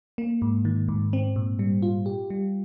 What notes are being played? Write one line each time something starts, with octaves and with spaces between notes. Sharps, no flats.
A#3
G#2
D#3
G#2
C4
A#2
G3
F4
G4
G3